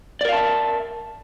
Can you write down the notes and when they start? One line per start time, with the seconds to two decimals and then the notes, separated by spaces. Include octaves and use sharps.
0.21 D5
0.25 A#4
0.29 F5
0.33 A5
0.36 E5